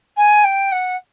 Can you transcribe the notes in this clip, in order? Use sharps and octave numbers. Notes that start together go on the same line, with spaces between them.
G#5
G5
F#5